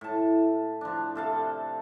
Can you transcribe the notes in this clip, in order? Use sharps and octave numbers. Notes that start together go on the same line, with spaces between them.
A2 A5
F3 D4
C3 A4 F5